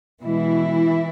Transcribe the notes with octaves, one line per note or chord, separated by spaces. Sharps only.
B2 E3 G#3 E4